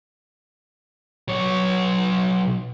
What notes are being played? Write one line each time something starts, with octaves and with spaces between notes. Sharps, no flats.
B1 C#5